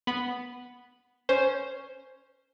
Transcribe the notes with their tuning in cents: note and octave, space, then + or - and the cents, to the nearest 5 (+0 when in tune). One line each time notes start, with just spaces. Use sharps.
B3 +0 B5 +0
C#4 +0 C5 +0